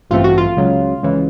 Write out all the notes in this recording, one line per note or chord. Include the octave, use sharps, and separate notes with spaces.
A1 G2 E3 A3 C4 F4
F#4
F4
C#2 C#3 F#3
C#2 C#3 E3